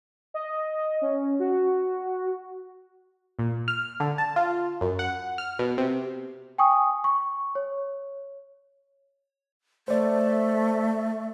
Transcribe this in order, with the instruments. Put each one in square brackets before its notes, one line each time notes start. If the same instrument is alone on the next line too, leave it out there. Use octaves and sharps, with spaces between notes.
[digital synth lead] D#5
C#4
F#4
[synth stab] A#2
F6
D3
A5
F4
F#2
F#5
F6
B2
C3
[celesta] G5 G#5 C#6 D#6
C#6
C#5
[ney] A3 [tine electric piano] C5 D5